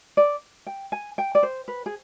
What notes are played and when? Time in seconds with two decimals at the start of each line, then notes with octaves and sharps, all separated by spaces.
0.17 D5
0.67 G5
0.92 G#5
1.18 G5
1.35 D5
1.43 C5
1.68 B4
1.86 G#4